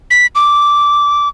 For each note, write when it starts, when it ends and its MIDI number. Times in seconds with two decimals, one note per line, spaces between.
0.11 0.26 95
0.35 1.28 86